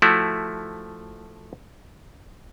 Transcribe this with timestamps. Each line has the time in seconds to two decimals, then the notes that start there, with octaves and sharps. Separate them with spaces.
0.02 F3 A3 E4 F#4